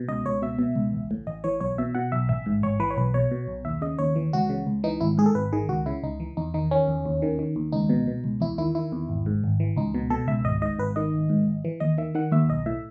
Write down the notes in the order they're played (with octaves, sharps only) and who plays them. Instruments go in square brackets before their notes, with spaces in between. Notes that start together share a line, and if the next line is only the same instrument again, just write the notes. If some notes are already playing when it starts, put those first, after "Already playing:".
Already playing: [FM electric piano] B2
C#2 D#5
C#2 C#5
B2 E5
B2
C#2
A1
A2
A1 D#5
E3 C#5
B1 C#5
B2 E5
B2 F#5
B1 E5
A1 E5
G#2
A1 C#5
E3 B4
C#5
B1 B4
B2 C#5
B2
B1
D#2 E5
C#3 D#5
D#2 C#5
E3
C#2 F#4
C#3
C#2
E3 D#4
G#1 E4
G#2 G#4
A4
G#1 B4
D#3 G#4
C#2 F#4
C#3 E4
C#2 D#4
E3
E2 D#4
D#3 D#4
D#3 C#4
E2
D#2
D#3
D#3
D#2
C#2 D#4
B2
B2
C#2
E2 E4
D#3 E4
D#3 E4
E2
G#1
G#2
G#1
E3
C#2 D#4
B2
B2 A4
C#2 E5
G#1 D#5
G#2 D#5
G#1 B4
D#3 D#5
G#1
G#2
G#1
E3
D#2 D#5
D#3 E5
D#3 F#5
D#2 E5
B1 D#5
A2 E5